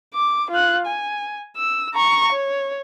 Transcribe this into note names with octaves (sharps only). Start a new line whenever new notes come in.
D6
F4 F#6
G#5
E6
A#5 C#6
C#5